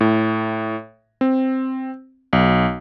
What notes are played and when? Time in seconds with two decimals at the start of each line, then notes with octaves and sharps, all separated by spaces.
0.01 A2
1.21 C4
2.33 B1